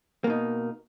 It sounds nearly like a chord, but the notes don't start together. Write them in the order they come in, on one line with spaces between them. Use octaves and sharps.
A#3 B2 D#4